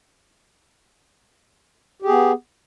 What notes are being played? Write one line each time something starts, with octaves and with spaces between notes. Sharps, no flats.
B3 G4 G#4